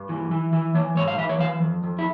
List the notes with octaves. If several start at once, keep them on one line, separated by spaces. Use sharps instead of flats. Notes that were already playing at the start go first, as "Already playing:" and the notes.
Already playing: G2
E3
E3
E3
E3 C#5
G#2 C#5
F5
E3 E5
C#5
E3 F5
F2
F2
E4